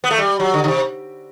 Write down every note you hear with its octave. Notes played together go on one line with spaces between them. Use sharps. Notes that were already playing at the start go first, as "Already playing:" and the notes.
B3
A3
G3
F#3
D3
D3
C3